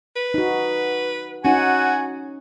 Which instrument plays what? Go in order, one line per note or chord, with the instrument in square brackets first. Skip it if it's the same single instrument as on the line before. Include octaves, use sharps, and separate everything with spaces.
[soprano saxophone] B4
[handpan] D#4 F#4
[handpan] C#4 D#4 [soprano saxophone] F#4 [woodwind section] F#5 G#5